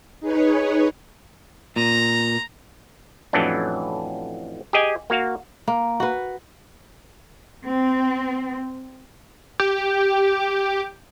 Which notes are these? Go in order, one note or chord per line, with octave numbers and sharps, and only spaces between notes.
D#4 G#4 B4 C#5
A#2 A#5
F2 A2 E3 F#3 C#4 D4
G4 G#4 D#5 G5 G#5
A#3 F#4 F5
A#3
F#4 B4
C4
G4